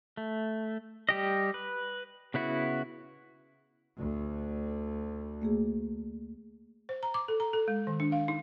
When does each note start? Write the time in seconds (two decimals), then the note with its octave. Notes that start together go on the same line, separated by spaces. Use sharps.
0.17 A3
1.09 G3 G4 D#5
1.54 B4
2.34 C#3 B3 E4 F#4
4.00 D2
5.42 A3 A#3 G#4
6.89 C5
7.03 A#5
7.14 D6
7.28 A4
7.40 A#5
7.53 A4
7.68 G#3
7.87 D#3
8.00 D4
8.12 F5
8.28 D#4